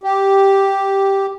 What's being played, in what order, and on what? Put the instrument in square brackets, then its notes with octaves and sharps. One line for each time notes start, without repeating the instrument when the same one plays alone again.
[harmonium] G4